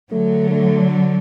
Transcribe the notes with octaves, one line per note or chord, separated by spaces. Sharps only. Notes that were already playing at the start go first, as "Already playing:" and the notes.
D3 F#3 A3
A3